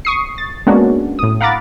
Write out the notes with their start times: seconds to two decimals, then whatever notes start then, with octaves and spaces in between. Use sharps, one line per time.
0.05 C#6 D#6 C7
0.38 A6
0.67 G#3 A#3 B3 C#4 D4 F#4
1.19 A2 D#6
1.41 F5 F#5 A#5 B5 D6 A6